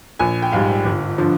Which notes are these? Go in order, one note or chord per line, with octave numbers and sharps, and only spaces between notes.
A#1 G#5
G5
G#2 G3 F5
G1
D3 F3